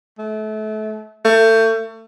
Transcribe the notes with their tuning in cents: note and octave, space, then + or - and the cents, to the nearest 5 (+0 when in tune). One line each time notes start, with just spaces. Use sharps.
A3 -30
A3 +30